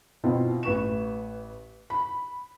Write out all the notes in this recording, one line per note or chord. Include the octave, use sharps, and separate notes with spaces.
B2 C4 E4 F4
A1 B4 C#6 E7
B5